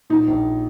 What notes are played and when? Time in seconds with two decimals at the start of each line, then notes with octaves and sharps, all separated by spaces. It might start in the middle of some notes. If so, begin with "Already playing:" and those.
0.10 A#2 D#4
0.27 A#1